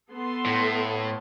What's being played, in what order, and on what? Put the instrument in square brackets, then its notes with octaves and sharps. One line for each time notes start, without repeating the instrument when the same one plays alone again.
[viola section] B3 A4 C6
[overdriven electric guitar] A2